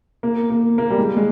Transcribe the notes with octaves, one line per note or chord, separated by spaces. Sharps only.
A#3
A#3
A#3
G3
G#3
G#3